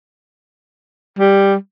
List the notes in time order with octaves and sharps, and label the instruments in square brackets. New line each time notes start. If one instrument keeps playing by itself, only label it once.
[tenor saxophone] G3